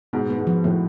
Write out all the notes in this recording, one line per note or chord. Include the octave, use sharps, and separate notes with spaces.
G#2 B2 B3
B3
G#2
F3
A2 F3